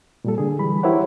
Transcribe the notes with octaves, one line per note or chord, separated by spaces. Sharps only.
A#2 G3 A4
D3 G#4
E3 G3 B5
E4 G4 A#4 C5 C#5 F#5